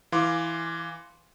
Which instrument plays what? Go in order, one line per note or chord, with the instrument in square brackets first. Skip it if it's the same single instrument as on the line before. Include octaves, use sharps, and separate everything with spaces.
[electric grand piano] E3 F5 C6 D6